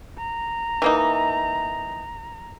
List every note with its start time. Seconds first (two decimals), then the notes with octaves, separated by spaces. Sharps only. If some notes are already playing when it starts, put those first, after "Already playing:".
0.18 A#5
0.82 E3 A#3 D#4